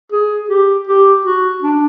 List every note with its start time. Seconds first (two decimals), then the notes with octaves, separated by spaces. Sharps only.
0.12 G#4
0.50 G4
0.87 G4
1.25 F#4
1.62 D4